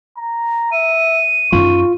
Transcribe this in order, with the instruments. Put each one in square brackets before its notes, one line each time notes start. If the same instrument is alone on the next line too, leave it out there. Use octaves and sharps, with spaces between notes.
[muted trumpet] A#5
[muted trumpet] E5 [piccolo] D#7
[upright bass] F#2 D#4 [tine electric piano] F4 [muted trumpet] C#6